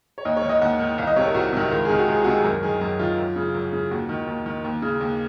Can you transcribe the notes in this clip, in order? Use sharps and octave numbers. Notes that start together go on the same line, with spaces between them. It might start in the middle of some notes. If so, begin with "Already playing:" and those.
C#5
D#2 D#5
C#5
D#3
D#5
D#2 F#5
D#3
C2 F5
D#5
C3 D#3 C#5
A#4
C2 F#4
C3 D#3
C#2 A#4
C3 D#3 G#4
F#4
C#2 G#4
C3 D#3 F#4
G#4
F#2 A#4
D#3 G#4
F#2 G#4
D#3 F4
F#2
C#3
F#2
C#3
D#2 F#4
D#3
D#2
D#3
D#2
C#3
D#2